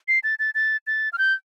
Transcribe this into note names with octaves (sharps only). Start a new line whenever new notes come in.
C7
A6
A6
A6
A6
F6
G6